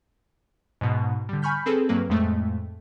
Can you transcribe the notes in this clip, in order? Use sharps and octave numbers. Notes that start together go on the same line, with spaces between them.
G#2 B2
D3 G3
G#5 B5 C#6 F6 G6 B6
C4 G#4 A4 B4
G2 F#3 A#3 B4
F2 A2 G#3 A3